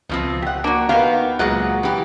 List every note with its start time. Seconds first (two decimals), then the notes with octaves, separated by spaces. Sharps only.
0.09 C#2 B2 F3 C4
0.42 G4 F#5
0.64 A#3 D4 F#4
0.89 B2 D#3 B3 G4 F5
1.39 C#2 A#2 F#3 G#3 F#4 F#5
1.83 E3 G4